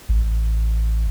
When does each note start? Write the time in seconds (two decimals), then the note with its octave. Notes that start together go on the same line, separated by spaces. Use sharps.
0.09 A1